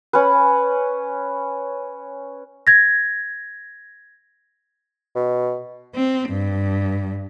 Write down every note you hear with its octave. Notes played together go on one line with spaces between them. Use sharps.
C#4 B4
G#6 A#6
B2
C4
G2